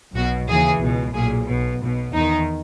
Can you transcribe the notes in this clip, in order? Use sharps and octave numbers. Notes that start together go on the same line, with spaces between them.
B1 B2 F#4
D#2 C#3 E3 G#4
C#2 B2
B1 A#2 G#4
B1 B2
B1 B2
E2 D#3 D#4